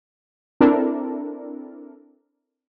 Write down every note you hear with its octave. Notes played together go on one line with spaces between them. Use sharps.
C4 D4 E4 A4 A#4